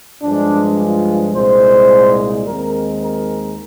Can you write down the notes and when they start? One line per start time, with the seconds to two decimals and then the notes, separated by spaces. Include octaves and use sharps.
0.22 G2 F3 G#3 D4
0.78 F4
1.34 C2 A#2 G#3 C5
2.45 D#2 D#3 G#3 C4 A#4
3.02 A#4